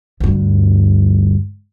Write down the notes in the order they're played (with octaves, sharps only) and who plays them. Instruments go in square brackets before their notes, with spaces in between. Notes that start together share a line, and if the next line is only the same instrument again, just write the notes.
[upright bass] D2 G2